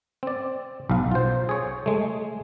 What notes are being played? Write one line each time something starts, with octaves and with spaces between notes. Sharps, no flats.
C4 D5
B1 F5
F4 C5
G#4 C#5
G#3 A3